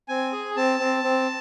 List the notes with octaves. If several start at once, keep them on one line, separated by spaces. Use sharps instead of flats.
C4 G#5
G#4
C4 A5
C4
C4